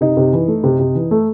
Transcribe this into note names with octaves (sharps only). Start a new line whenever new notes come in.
C3 D#4
C3
E3
A3
C3
C3
E3
A3